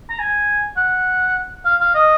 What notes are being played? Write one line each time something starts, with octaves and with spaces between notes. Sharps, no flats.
A#5
G#5
F#5
F5
F5
D#5